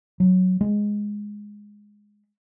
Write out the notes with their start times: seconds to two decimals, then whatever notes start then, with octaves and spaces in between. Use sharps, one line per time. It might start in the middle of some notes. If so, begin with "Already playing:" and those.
0.20 F#3
0.61 G#3